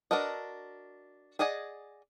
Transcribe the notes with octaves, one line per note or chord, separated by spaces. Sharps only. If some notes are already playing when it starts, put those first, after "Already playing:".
D4 F#4 A#4 B4 D#5
G#4 D5 D#5 F#5 G#5